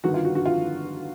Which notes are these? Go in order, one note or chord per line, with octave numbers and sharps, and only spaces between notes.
G1 G2 D#3 F#4
F4
F#4
F#4
F4